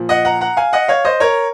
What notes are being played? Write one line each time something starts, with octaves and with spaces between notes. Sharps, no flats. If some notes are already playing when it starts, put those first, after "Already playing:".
Already playing: A#2 F3
D#5 F#5
F#5 A#5
F#5 A#5
F5 G#5
D#5 F#5
C#5 F5
C5 D#5
A#4 C#5